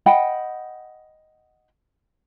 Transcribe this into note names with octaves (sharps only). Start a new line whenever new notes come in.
D#5 F#5 G5 B5